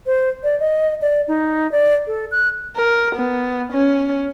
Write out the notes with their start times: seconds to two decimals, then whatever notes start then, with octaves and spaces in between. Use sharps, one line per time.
0.06 C5
0.43 D5
0.60 D#5
1.02 D5
1.28 D#4
1.72 D5
2.07 A4
2.31 F#6
2.76 A#4
3.16 B3
3.73 C#4